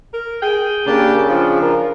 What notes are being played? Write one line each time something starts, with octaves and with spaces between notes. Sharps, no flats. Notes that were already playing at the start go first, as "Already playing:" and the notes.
A#4
G#4 G5
C#3 A#3 D4 G4 A5
F3 D4 F4
A#4